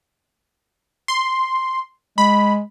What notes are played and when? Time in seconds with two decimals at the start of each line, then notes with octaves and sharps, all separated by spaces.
1.08 C6
2.18 G#3 B5